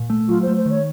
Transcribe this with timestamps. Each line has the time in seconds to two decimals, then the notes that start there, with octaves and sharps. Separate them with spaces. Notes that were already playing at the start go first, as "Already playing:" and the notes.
Already playing: A#2
0.10 A3
0.28 F#3 F4
0.42 A3 C5
0.57 C5
0.66 D#3 C#5